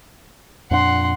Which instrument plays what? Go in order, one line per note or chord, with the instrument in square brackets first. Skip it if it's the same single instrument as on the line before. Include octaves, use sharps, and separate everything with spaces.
[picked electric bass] F2 A#2 D4 [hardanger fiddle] F#5 C6